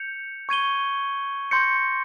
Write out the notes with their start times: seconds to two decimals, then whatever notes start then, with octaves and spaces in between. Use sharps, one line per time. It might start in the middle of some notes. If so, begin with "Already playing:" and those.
Already playing: G6 C#7 F7
0.49 C#6 G#6 D#7 G7
1.51 C6 G6 A#6 C#7